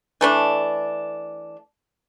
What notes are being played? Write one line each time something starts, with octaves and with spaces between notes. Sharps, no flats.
E3 A3 D4